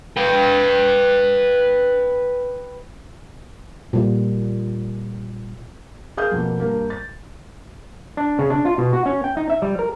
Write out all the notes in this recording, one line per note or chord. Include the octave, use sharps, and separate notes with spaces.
B4 G5
A#2 G3
G#4 A#4 F5 D#6 G6
F2 B2 A#3
G2 A#3 A#4
A6
D4
C#3
D4
F4
B2
F#4
C#4
G5
D#4
E5
G3
A#4